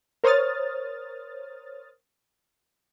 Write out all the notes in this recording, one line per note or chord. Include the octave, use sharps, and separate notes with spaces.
A#4 C5 C#5 D#6 F6 A6